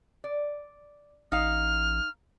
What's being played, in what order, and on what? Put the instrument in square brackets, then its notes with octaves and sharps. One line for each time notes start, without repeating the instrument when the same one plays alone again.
[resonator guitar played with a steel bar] D5
[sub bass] A1 [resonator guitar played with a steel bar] D#4 F5 [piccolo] F6